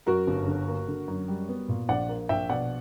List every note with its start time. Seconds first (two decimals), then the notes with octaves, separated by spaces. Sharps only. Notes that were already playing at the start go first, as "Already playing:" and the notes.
0.06 F#2 F#4 A#4
0.27 G1
0.48 D3
0.68 A#3
0.88 D3
1.08 F#2
1.28 G3
1.49 B3
1.68 A#2
1.89 A#1 D5 F#5
2.09 A#3
2.29 A#1 E5 G5
2.49 B2 D5 F#5